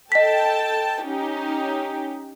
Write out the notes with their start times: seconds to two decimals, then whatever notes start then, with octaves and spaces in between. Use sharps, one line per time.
0.12 A4 D#5 G5 A5 B6
1.03 C#4 D#4 G4